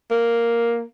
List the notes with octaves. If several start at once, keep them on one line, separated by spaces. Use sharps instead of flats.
A#3